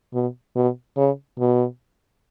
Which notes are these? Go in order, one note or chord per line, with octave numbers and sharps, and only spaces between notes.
B2
B2
C#3
B2